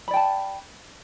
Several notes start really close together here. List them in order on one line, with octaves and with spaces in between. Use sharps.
B5 D5 G5 A5